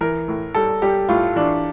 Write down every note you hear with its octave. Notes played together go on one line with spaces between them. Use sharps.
E3 A#4
A2
G3 A4
G3 G4
A2 F4
E3 D4